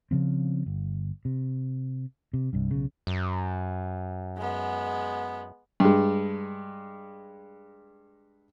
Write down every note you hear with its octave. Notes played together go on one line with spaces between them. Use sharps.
C#3 F3 C4
G1
C3
C3
C2 G2
B1 C#3
F#2
G#3 B3
G2 G#3